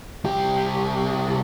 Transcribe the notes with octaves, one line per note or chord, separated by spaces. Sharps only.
C2 G4